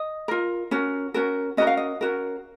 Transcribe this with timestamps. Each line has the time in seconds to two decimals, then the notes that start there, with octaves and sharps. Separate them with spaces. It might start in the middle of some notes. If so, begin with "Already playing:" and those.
Already playing: D#5
0.28 F4 A#4
0.71 C#4 F#4 A#4
1.14 C#4 F#4 A#4
1.57 C#4 F#4 A#4 D#5
1.67 F5
1.77 D#5
2.01 C#4 F#4 A#4